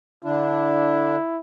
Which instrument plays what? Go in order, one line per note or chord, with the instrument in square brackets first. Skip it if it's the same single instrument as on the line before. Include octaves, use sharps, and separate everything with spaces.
[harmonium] D3 D4 [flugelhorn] E4